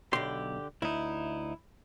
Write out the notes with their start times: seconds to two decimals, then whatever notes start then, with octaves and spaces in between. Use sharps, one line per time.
0.13 B1 D3 G4 C6
0.82 D2 D#4 E4